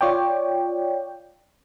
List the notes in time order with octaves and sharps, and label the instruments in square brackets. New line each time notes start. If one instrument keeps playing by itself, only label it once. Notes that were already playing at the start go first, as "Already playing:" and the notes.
[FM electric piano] F4 C#5 D5 G5